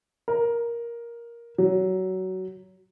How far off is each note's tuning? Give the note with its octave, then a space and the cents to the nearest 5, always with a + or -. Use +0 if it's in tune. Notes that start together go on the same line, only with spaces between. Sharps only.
A#4 +10
F#3 +20